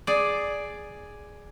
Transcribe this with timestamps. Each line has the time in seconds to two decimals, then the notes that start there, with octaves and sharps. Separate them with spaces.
0.07 G#4 D5